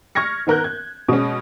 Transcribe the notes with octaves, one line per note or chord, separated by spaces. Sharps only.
C#6 F6 G#6 A#6 C#7
D#3 B3 A#4 F#6 G6
G#6
B2 G#3 C#4